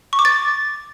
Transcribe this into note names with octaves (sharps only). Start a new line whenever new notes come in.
C#6
D6
A6